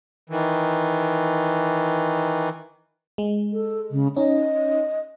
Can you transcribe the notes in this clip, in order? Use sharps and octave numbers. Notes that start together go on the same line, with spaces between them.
D#3 E3
G#3
A4
C#3
C#4 D#4 D#5